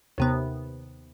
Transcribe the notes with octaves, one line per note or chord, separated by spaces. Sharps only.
D#2 C3 B3